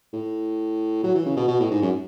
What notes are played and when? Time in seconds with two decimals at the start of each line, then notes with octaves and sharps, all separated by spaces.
0.13 A2
1.04 F#3
1.14 E3
1.26 C#3
1.36 B2
1.48 B2
1.60 A2
1.71 G#2
1.82 F#2